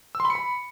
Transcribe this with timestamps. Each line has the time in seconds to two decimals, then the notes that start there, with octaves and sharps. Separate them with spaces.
0.15 E6
0.20 C6
0.25 B5
0.30 C#7
0.35 B5